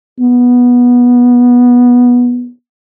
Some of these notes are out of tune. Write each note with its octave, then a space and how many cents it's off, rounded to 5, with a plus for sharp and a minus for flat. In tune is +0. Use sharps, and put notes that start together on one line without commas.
B3 -15